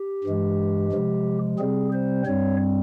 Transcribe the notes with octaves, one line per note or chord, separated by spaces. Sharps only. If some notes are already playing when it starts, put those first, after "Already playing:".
Already playing: G4
G2 E3 G#3
C3 F3 G#3
C3 G3 C4 G#4
C5
G2 G3 C4 C#5